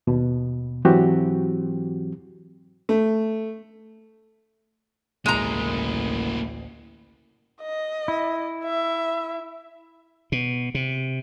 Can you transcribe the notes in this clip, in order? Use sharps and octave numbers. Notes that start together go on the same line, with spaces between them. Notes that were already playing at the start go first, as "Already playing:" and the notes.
D#2 B2
G#2 E3 F#3 C4 F#4 G4
A3
A1 D2 G#3 A#3 E4 A#5
D#5
E4
E5
B2
C3